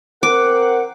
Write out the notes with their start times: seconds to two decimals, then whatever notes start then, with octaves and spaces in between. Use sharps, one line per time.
0.23 C4 A#4 C5 F#5 D6